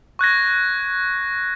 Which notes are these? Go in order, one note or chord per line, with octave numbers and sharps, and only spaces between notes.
C#6 F#6 G#6 A#6